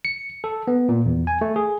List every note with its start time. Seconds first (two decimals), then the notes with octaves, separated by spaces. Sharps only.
0.05 C#7
0.44 A4
0.67 B3
0.89 A#2
1.06 E2
1.27 G#5
1.41 A3
1.56 G#4